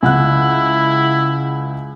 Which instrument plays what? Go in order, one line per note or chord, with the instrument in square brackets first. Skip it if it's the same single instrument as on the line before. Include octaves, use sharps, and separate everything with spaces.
[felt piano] C#2 F#5 F#6 [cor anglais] E4